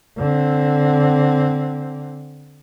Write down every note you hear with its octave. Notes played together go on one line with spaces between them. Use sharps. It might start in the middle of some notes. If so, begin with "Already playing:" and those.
D3 C4